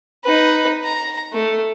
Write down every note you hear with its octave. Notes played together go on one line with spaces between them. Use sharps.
D#4 B4
A#5
A3